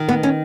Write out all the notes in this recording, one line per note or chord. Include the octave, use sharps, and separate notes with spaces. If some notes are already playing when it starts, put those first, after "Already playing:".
Already playing: D#3
B3
C#4